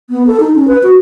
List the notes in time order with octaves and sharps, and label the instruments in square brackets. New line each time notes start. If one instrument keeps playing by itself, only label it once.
[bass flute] B3
A4
D#4
C#4
B4
F#4